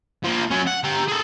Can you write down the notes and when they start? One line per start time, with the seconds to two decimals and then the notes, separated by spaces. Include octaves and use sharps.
0.24 F3 A#3
0.50 F#3 C#4
0.67 F#5
0.84 G4 A#5
1.08 G#4 A4